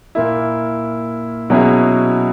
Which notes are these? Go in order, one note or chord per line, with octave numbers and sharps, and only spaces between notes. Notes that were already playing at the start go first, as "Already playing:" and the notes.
A#2 A#3 E4
B2 F#3 C#4 E4 G#4